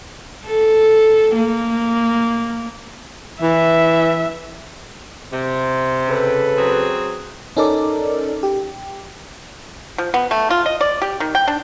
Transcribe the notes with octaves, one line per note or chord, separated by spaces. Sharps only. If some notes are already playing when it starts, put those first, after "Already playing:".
A4
A#3
E3 E5
C3
C#3 A4 B4
F#3 C4 G#4
C#4 D#4 A4 A#4 D5
G4
F3
B3
A3
F4
D#5
D5
G4
D#3
G5
D4